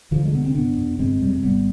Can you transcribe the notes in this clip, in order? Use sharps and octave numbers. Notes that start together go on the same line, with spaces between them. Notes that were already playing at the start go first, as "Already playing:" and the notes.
D2 D3 F3
G#3
C3 B3
C4
G1 B3 D4
F2 C3
G1 G#3 C4
F2 C3 G3
G#3
G#1 G3 B3